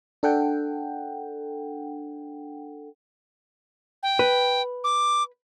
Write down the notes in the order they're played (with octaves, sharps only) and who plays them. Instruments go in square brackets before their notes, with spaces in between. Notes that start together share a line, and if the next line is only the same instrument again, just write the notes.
[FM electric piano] D4 A4 F#5 G5
[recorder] G5
[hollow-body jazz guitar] B4
[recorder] D6